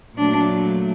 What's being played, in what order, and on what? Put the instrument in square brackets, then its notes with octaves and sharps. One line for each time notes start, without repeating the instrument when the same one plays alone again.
[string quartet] A#2 F#3 A3 D4